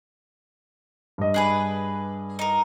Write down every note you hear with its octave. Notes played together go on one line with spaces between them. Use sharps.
G2 D#5
D4 G#4 B4
D#4 A#4